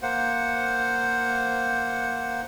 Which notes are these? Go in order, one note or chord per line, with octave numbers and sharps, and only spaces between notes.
A#3 C5 F#5